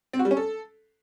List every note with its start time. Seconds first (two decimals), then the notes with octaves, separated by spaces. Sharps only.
0.13 C4
0.19 F#4
0.25 G3
0.31 C#4
0.37 A4